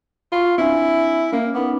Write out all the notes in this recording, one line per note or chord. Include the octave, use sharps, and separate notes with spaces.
F4 B5 C#6
C4 D4 E4 G#5
A#3 C#4 F6
B3 D#4 B5 D6